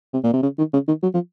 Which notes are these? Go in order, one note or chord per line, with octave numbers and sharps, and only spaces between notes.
C3
A#2
C3
C#3
D#3
C#3
D#3
F#3
F3